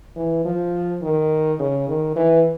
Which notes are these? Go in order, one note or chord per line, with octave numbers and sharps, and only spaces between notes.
E3
F3
D#3
C#3
D#3
E3